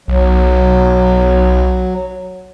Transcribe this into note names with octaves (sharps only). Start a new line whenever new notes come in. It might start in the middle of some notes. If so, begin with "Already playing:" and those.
B1 F#3